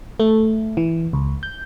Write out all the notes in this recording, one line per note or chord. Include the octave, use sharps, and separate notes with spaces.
A3
E3
C#2
G6